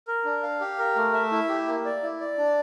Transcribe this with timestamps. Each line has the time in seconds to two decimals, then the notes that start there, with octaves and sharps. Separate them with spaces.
0.07 A#4
0.25 D4
0.43 F5
0.60 G4
0.78 A#4
0.96 A3
1.14 E5
1.32 E4
1.49 G4
1.68 A#3
1.85 D5
2.03 E4
2.21 D5
2.38 D4